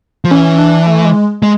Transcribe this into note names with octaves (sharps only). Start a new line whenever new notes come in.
F3
E3 C#4
D4
A3
G#3
G#3